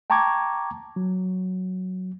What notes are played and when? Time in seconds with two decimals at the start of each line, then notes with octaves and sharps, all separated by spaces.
0.10 G5 A5 A#5 C#6 D6 G#6
0.96 F#3